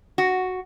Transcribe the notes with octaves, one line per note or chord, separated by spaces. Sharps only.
F#4